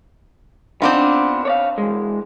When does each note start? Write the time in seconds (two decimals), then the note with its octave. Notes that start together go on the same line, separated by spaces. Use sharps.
0.82 B3 C4 D4 D#4 F4
1.45 C#5 D5 F5
1.78 E3 G#3